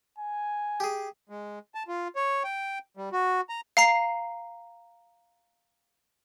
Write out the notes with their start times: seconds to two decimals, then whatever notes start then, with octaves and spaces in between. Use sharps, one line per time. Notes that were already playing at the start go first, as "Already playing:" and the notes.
0.19 G#5
0.80 G4 G#4
1.29 G#3
1.75 A5
1.88 F4
2.16 C#5
2.44 G5
2.97 G3
3.13 F#4
3.49 A#5
3.77 F5 A#5 C7